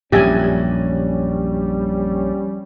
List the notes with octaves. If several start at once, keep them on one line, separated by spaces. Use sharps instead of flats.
A#1 F#2 G3 C#4 G4 E5 G#5